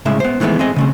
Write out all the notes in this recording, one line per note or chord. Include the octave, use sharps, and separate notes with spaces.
C2 A2 C#3 G#3 E5
B3 C5
D#3 E3 G#3 A3 B3
C4 G#4 D#5
C#3 A3 C4